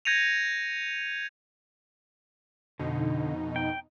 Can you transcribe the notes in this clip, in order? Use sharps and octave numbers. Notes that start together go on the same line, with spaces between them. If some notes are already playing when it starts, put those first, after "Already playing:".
G6 G#6 A#6 C#7 D#7 F7
F2 B2 D3 D#4
G5